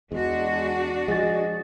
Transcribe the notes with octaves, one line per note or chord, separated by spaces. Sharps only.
E2 G#3 D4 F#4
F3 G#3 G#4 D#5 A6